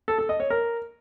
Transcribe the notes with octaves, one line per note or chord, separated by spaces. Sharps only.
A4
A4
D#5
C#5
A#4